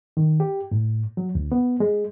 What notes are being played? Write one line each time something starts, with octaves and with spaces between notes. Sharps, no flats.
D#3
G4
A2
F#3
D2
B3
G#3